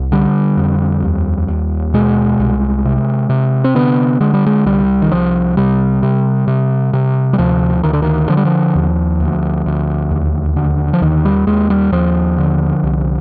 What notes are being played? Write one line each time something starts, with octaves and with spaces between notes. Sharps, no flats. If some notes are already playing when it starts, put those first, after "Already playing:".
Already playing: C2
D3 G3
F2
D#2
D#2
B2 G#3
C2
C3
C3
C4
D3 B3
D3 G#3
G3
G#3
C2 G3
D#3
C2 F3
C3 G3
C3
C3
C3
G3
D2 F3
D2 D#3
D3
D#3
D3 F3
G3
F3
D#2
D2
D2
D#2
D3
F3
D#2 D#3
G3
D#2 G#3
G3
D#2 F3
D3
C2